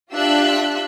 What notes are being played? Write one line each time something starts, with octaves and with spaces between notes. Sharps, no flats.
D4 F4 G4 E5 E6 F#6